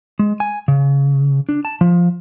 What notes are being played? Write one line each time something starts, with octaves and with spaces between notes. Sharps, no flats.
G#3
G#5
C#3
D4
A5
F3